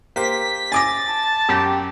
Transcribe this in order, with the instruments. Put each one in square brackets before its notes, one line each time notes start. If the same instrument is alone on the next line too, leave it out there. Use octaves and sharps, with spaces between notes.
[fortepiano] A#3 G4 C5 [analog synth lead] B6
[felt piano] G#5 D6 A#6 [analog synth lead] A6
[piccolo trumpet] A5
[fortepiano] F#2 [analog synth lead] G4